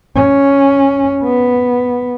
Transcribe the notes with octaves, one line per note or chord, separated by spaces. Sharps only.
C#4
B3